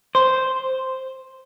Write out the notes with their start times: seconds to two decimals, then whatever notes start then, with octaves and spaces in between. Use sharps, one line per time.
0.15 C5